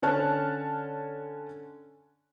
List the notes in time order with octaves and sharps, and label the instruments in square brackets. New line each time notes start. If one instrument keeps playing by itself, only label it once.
[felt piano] D3 C#4 C#5 A5 F6 F#6